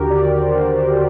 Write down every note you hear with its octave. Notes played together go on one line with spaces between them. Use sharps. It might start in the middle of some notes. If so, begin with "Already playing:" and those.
Already playing: D#2 D3 F#4 G4 A#4
D5
C5
C5